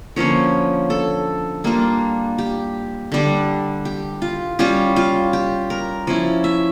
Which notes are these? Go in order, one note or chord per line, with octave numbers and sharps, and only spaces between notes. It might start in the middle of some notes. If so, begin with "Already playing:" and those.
D3 F3 A#3 C#4 C#5
A4
G3 A#3 D4 F4
G4
D3 G3 D4
G4
F4
G3 C#4 F4 G4
F4
G4
A#4
F3 C#4 E4 D5
E5